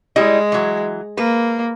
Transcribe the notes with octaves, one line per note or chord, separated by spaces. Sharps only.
G3 G#3 E4 D#5
E3 F#3
A#3 B4